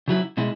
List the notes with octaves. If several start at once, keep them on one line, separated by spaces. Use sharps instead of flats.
C#3 F#3 E4
B2 G#3 E4